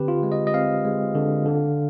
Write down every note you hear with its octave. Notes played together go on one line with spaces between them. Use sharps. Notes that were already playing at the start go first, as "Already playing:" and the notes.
Already playing: D3 C4 G4 B4
F4
G#3
D#5
D#5
C4 F5
G#3
D3
D3